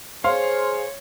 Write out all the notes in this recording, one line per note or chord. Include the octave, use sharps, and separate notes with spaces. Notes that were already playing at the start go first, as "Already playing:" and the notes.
G#4 C5 C#5 F5 C6